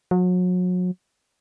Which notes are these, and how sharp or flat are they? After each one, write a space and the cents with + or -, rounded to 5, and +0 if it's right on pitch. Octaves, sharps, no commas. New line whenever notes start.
F#3 -35